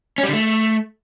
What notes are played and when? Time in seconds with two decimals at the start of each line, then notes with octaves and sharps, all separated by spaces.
0.18 C#4
0.23 G3
0.28 D3
0.33 A3